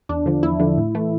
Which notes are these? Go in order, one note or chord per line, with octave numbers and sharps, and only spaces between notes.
E2 D4
D3 F3
E2 E4
D3 F3
A2
E3 A3